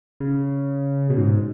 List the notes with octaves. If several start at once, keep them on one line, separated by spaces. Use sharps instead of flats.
C#3
B2
G#2